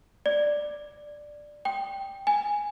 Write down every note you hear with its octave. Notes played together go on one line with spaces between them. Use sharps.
D5
G5
G#5